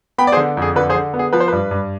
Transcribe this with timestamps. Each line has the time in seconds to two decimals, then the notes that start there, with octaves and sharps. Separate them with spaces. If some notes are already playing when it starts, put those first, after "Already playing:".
0.18 B3 G5 B5
0.27 D5
0.32 G#4 C5
0.37 D3
0.57 F2 G#4
0.76 D3 B4
0.89 G#4 C5
0.95 D3
1.14 B3
1.19 G#4
1.33 F3 B4
1.40 C5
1.48 G2 B4
1.71 G2